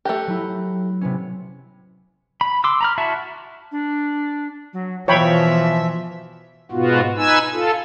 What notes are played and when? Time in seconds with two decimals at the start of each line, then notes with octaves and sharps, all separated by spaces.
0.05 A3 G4 F#6 A#6
0.27 F#3 E4
1.01 C3 B3 C#4
2.41 B5
2.64 C6 D6 E6
2.81 A#5 B5 F6
2.98 E4 F#4 E5 A5
3.72 D4
4.73 F#3
5.08 B2 E3 F3 C#5 E5 G5 B5
6.72 G#2 B2 B3 F4 F#4
7.17 D#4 B4 G#5 E6
7.53 F4 A4